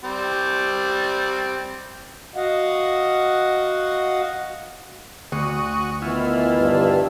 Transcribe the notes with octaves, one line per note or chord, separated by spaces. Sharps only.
G3 C4
F#4 D#5 F5 F#5
D2 F#4 C#6 D#6
D#3 E3 B3 E4 F4
G2